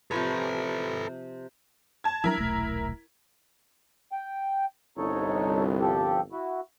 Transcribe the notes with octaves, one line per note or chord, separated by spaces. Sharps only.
C3 F3 A4 B4 C#5
A5 G#6
F3 F#3 D4 E4 A#4
D#1 B1 A3
G5
G1 C2 D#4 A4 C#5
F3 G4 A4
E4 F#4